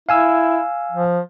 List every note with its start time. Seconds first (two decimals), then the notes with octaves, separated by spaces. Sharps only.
0.09 E4 F5 G#5 E6
0.92 F3